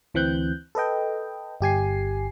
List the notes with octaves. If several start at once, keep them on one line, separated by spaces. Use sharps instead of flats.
D2 E3 C4 F#6 G6
A4 B4 D#5 G5
G1 G4 G#5 C7